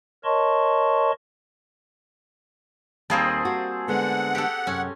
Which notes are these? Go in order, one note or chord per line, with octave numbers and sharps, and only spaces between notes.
A#4 C#5 D#5 A5 C6 C#6
D#2 G3 A#3 C4 G#4 C5 A5
F#4
D3 G#3 B3 F#5
G4 A4
F#2 C3 C#4